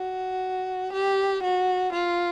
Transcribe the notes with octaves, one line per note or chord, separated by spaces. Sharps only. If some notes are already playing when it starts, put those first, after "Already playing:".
Already playing: F#4
G4
F#4
F4